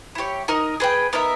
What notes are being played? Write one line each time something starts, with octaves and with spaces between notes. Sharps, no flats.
E4 G4 C#5
D#4 A#4 D#5
G#4 B4 G5
B3 D#4 A#4 E5